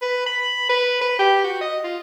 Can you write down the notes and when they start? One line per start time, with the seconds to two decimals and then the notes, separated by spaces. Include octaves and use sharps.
0.02 B4
0.26 B5
0.69 B4
1.01 B4
1.19 G4
1.44 F#4
1.61 D#5
1.84 F4